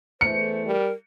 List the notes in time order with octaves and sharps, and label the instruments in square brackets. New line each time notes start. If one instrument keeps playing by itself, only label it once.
[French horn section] E2 E3 A3 [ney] C5 [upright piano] C#7
[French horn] G3 [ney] A#4